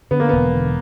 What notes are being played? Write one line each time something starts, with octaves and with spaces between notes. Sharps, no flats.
D3 B3
A#3
E1 B3
D3